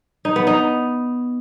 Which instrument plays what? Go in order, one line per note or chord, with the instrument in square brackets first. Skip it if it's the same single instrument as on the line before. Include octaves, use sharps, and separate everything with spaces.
[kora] D#4
B3
D#4